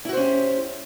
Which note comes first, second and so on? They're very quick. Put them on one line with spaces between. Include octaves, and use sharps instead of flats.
E4 F#4 C5 C#4 G4